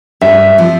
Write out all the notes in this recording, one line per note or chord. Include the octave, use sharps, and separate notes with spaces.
G2 E5
F3 C4